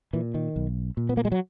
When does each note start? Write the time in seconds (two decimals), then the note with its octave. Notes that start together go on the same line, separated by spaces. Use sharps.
0.13 A#2 E3
0.34 D#3
0.56 B1
0.97 A#2
1.09 B3
1.17 A#3
1.25 G#3
1.32 F#3